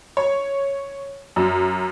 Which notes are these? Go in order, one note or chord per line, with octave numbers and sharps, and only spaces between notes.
C#5
F#2